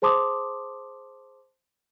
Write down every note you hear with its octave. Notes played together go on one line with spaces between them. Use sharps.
G#4 C5 A5 C6 D6 D#6